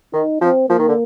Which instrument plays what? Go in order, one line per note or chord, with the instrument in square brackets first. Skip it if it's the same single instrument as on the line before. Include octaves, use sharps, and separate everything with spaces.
[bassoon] D#3 [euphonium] D#4
[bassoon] F3 [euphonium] C4
[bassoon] F3 [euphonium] A#3
[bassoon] D#3
D3